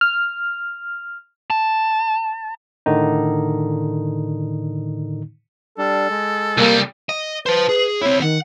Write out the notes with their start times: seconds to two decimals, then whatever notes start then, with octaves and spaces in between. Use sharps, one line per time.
0.01 F6
1.50 A5
2.86 A2 D3 D#3 D#4
5.78 G3 D4 A4
6.10 G#3
6.58 C2 G3 A#3
7.09 D#5
7.46 B4 C5 A5
7.69 G#4
8.02 C4 E4 C#5
8.22 D#3 F#5